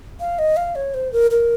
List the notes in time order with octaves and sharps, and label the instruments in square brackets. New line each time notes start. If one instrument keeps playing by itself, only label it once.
[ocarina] F5
D#5
F5
C#5
C5
A#4
A#4